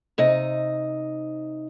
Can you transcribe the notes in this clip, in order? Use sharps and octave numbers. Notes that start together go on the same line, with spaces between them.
C3 D#4 D#5